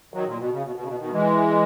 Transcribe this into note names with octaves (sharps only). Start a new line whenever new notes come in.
D#3 F#3
A#2
B2
C#3
B2
B2
C#3
B2
B2 D#3
E3 G#3